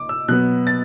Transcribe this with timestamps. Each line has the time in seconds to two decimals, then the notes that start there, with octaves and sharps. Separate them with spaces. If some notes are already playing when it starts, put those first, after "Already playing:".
Already playing: D6
0.09 E6
0.28 B2 F#3 B3 F#6
0.67 A6